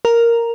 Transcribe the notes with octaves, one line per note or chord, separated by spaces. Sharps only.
A#4